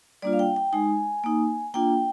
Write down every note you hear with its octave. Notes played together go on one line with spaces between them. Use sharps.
G3 A#3 D4 F4 D5
F5
G5
G5
G#3 D#4 G#5
A#3 D#4
A#3 D4 F4 G5